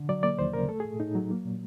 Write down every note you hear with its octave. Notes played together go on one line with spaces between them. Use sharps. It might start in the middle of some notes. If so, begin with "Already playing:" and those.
Already playing: D3
F#3 D5
A#3 D5
D#2 C5
C#3 A#4
A3 A4
G#4
A2
A2 D#4
F#3
A#3
A#2